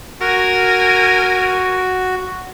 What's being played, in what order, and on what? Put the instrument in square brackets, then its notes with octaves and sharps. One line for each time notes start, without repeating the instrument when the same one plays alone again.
[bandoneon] F#4 [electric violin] A#4 G#5